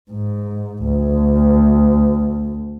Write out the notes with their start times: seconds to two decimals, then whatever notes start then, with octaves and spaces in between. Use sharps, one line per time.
0.11 G#2
0.84 D2